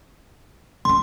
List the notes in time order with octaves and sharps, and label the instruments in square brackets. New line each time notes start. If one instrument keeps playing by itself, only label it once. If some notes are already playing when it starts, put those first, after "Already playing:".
[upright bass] D3 C#4 [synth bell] C6